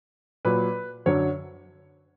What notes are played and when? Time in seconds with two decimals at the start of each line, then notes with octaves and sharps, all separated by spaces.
0.45 A#2 F#3 B4
1.06 F#2 D3 F#3 C#5